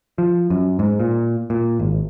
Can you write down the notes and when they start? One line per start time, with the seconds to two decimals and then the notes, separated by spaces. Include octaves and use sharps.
0.18 F3
0.50 F#2
0.79 G#2
1.00 A#2
1.50 A#2
1.79 G#1